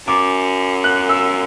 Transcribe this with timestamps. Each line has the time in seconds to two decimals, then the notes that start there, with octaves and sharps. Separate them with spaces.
0.07 F#2 D6
0.84 F#6
1.09 E6